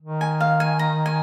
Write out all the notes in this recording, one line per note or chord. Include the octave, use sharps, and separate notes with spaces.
D#3
G#5
F5
G#5
A#5
G#5